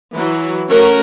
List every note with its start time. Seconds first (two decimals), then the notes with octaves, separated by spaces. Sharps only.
0.14 E3 F#3
0.68 A3 C#4 F#4 A#4 C#5